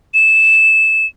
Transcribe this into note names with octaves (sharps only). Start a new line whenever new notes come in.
E7